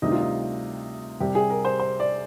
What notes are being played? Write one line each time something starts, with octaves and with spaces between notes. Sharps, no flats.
D2 C3 D#3 G3 D#4
F4
D#4
C2 C3 G3 G4
G#4
A#4
C5
C5
D5